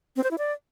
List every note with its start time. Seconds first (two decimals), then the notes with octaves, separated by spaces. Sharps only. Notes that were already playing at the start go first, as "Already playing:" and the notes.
0.16 C4
0.24 C5
0.31 E4
0.38 D5